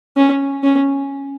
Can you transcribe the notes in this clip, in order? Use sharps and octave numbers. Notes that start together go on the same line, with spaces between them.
C#4
C#4